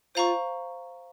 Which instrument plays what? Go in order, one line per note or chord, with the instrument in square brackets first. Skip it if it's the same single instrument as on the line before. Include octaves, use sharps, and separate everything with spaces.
[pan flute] F4 [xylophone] C5 F5 A#5 C#6